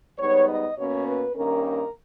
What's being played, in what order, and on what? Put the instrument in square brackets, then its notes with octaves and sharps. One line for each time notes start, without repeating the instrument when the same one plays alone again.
[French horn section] G#2 G3 B3 D#4 C#5
D#5
B2 A#3 C#4 C#5
B4
G2 D#3 A#3 C#4 A#4
A#4